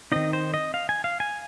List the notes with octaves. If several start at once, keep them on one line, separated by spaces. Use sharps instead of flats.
D#3 C4 D#4 D#5
C5
D#5
F5
G#5
F5
G#5